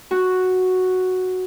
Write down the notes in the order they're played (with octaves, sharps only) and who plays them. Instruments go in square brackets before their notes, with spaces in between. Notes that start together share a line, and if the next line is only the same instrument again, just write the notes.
[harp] F#4